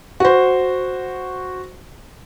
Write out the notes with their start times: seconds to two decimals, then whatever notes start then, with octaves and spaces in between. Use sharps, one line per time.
0.20 F#4 C5